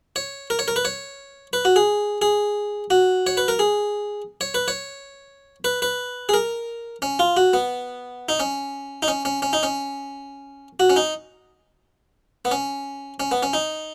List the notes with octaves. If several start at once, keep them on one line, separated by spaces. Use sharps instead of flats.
C#5
A#4
C#5
A#4
B4
C#5
B4
F#4
G#4
G#4
F#4
C#5
B4
A#4
G#4
C#5
B4
C#5
B4
B4
G#4
A#4
C#4
F4
F#4
B3
D#4
C#4
D#4
C#4
C#4
C#4
D#4
C#4
F#4
C#4
D#4
B3
C#4
C#4
B3
C#4
D#4